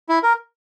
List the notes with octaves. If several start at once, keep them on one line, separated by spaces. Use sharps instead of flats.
E4
A#4